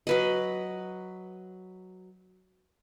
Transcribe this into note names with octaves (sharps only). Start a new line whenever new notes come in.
F#3 B4 D#5